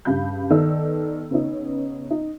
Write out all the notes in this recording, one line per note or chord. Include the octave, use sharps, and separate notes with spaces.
G2 C#3 F5 B5 G6
D#3 B3 A4 D5 E6
C#3 B3 C#4 D#4
D#4